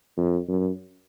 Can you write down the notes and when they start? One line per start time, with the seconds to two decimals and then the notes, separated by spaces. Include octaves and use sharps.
0.17 F2
0.48 F#2